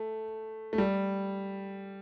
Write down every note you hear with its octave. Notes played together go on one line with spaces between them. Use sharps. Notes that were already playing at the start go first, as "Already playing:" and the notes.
Already playing: A3
A3
G3